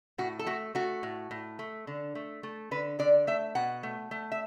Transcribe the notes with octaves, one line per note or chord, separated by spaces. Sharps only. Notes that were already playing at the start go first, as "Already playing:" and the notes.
A2 F#4
A4
A3 F#4
A3 F#4
A2
A2
A3
D3
A3
A3
D3 B4
D3 D5
A3 E5
B2 F#5
A3
A3
E5